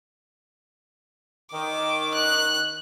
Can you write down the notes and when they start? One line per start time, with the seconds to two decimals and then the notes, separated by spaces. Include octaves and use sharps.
1.53 D#3 D6
2.14 F#6